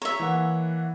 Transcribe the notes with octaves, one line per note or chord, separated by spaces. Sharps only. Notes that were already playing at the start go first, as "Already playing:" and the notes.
C#5 E5 A#5
E3 A#3 F#5